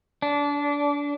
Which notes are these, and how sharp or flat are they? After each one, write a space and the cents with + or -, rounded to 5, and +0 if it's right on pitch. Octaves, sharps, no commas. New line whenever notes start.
D4 -25